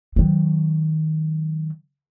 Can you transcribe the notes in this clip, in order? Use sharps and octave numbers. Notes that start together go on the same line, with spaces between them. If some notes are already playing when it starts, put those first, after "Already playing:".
D#3 F#3